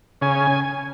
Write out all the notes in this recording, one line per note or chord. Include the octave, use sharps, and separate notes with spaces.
C#3 G#5